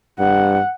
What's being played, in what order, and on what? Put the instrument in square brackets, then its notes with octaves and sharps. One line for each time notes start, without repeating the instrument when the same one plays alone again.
[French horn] G2 [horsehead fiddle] F#5